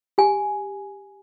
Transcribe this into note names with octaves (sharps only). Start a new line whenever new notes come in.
G4 G#5